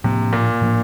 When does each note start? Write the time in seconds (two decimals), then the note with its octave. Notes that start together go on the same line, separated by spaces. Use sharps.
0.04 A2 C3 F3 A#3 D4
0.33 A#2
0.61 A2 F3 A#3 D4